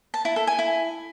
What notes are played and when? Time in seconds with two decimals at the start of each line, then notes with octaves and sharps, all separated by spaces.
0.14 A5
0.25 E4
0.36 A4
0.47 G#5
0.59 E4